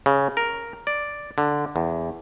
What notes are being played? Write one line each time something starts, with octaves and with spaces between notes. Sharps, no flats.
C#3
A#4
D5
D3
E2